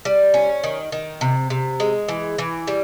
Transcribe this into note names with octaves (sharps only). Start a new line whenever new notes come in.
G3
C#4
D#3
D#3
C3
C3
G#3
E3
E3
G3